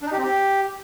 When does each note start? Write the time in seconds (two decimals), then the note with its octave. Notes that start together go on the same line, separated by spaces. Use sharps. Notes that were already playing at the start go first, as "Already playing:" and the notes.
0.01 D4
0.06 D#4
0.12 G4
0.18 C4
0.23 G4